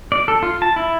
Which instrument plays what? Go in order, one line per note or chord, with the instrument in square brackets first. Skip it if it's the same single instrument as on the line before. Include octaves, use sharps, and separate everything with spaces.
[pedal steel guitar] D5
A4
F4
A5
E4